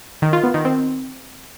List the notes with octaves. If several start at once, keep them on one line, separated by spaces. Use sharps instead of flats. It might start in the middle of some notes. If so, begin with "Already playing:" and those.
D#3
F4
B3
D#3
C4